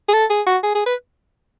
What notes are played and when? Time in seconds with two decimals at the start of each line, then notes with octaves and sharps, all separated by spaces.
0.08 G#4
0.14 A4
0.30 G#4
0.46 F#4
0.63 G#4
0.75 G#4
0.86 B4